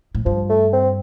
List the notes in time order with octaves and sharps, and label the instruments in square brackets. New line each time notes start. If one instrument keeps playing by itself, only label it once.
[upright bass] A2
[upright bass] G2 [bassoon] F3
[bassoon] A3
C4